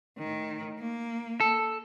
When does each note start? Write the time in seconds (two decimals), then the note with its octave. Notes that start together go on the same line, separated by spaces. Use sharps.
0.18 A2 D#3
0.79 A#3
1.40 A4